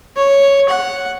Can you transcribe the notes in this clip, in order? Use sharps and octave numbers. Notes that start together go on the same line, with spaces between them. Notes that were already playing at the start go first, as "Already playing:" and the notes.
C#5
F#5